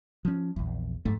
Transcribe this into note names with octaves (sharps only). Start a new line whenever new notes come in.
F3 C#4
A#1 E2
F2 G#2 A3